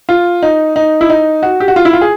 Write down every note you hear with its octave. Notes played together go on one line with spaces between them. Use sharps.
F4
D#4
D#4
E4
D#4
F#4
G4
F#4
F4
E4
F4
G#4